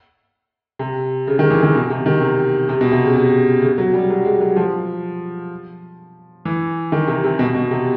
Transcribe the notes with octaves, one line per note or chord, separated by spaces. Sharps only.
C3
C#3
D#3
E3
D#3
B2
C3
D#3
C3
C3
B2
C3
C#3
C3
C#3
F#3
G3
F#3
G#3
F#3
F3
E3
D#3
C3
C3
B2
B2
C3